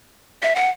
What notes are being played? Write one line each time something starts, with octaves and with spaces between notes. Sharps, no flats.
E5
F#5